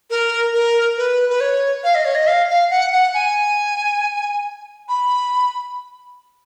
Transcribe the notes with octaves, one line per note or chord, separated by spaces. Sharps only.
A#4
A#4
B4
B4
C#5
F5
D#5
C#5
D#5
F5
F5
F#5
F#5
G#5
B5